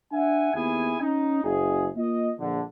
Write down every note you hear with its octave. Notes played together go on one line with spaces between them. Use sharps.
D4 E5 F#5 G#5
D#2 B3 E4 G#4 G#5
C#4 D#4
F#1 G#4
A#3 F4 D#5
A#1 D3